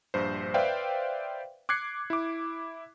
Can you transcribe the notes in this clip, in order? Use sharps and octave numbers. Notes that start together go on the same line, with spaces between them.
A#1 G2 C5
B4 C5 D5 E5 F5 G5
D6 F#6 G#6 C7 C#7
E4 D6